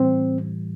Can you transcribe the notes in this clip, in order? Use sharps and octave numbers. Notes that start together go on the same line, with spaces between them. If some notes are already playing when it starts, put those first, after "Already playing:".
Already playing: A2 E3 G3 C4